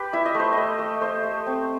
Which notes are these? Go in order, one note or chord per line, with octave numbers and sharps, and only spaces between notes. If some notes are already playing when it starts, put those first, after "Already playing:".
Already playing: G4 B4
E4 E5
D#5
A3
C5
A3 D#5
A3
A3 C5
A3
C4